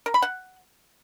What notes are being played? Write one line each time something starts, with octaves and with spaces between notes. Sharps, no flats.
A#4
B5
F#5